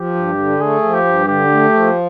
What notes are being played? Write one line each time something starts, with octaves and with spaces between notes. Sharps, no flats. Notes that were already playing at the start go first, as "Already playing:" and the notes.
Already playing: F3 G4
G2
D3
A3 G#4
F3
G4
G2
D3 G4
A3
F3